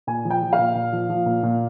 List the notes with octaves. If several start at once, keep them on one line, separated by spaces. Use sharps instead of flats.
A#2 G#5
F3
G5
F3
F5
A#2
A#2
F3
F3
A#2
A#2